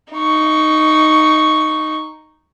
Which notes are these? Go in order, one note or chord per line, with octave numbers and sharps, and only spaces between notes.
D#4 C#6